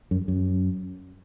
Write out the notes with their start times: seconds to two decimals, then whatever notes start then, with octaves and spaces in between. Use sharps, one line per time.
0.11 F#2
0.28 F#2